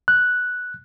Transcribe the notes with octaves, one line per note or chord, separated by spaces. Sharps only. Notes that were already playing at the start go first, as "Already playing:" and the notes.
F#6